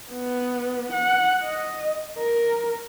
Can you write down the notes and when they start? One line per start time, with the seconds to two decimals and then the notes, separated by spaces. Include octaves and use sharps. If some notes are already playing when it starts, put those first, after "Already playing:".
0.11 B3
0.92 F#5
1.44 D#5
2.18 A#4